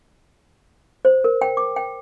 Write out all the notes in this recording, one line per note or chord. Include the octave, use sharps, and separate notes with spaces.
C5
A#4
G5
D6
G5